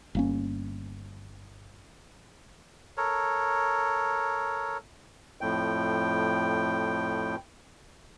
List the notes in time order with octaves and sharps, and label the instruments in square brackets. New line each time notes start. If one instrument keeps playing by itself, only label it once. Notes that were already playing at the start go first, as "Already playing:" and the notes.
[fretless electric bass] G1 A#3 C#4
[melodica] A4 A#4 C#5
[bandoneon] F2 A2 G5